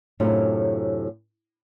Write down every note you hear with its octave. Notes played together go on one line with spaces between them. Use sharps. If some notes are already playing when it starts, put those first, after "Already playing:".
F#2 A2 C3 C#4 D4 F4